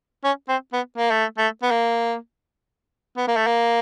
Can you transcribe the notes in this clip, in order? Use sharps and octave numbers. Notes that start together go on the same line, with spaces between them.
C#4
C4
B3
A#3
A3
A3
B3
A#3
B3
A#3
A3
A#3